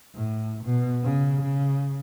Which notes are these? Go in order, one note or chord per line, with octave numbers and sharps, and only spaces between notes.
A2
B2
C#3
C#3